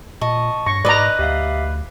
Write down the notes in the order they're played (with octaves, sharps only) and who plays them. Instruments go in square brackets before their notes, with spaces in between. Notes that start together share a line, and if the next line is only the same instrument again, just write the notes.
[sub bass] A#2 [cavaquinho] D#5 [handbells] A5 C#6
[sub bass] G2 [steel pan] C#6 [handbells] A#6
[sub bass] G#2 [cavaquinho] B4 D#5 [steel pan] D5 A#5
[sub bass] D2 [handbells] G4 E5 F5